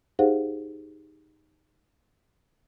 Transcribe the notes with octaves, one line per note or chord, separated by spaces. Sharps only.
D#4 G4 G#4 C5 F5 F#5